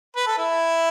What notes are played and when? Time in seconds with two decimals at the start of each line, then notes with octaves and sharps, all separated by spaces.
0.16 B4
0.27 A4
0.38 E4